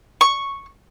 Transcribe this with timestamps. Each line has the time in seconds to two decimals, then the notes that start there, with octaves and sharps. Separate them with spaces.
0.21 C#6